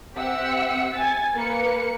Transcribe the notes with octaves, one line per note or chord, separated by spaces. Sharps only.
C4 G4 E5 F#5 E6 C#7
G#5 A6
A#3 B4 C#7